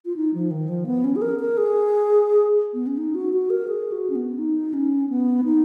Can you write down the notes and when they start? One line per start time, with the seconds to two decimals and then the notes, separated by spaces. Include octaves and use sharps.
0.05 F4
0.16 D#4
0.34 F3
0.51 D#3
0.68 F3
0.86 B3
1.04 C#4
1.16 G#4
1.22 A#4
1.40 A#4
1.57 G#4
2.74 B3
2.87 C#4
2.98 D#4
3.15 F#4
3.33 F#4
3.50 A#4
3.68 G#4
3.92 F#4
4.10 C#4
4.15 B3
4.38 D#4
4.74 C#4
5.10 B3
5.44 D#4